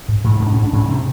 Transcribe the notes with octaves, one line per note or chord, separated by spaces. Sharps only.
G#2
G#2
G#2 A3
D4
C#4
G#2
D4
G#2 C#4
C3 C4